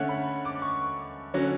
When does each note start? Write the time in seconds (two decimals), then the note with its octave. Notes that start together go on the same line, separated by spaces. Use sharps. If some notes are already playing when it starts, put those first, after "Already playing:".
Already playing: D3 A3 C#4 F#5
0.09 B5
0.45 D6
0.62 C#6
1.34 D3 F#3 C#4